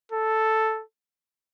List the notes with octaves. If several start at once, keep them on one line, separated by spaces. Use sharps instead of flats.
A4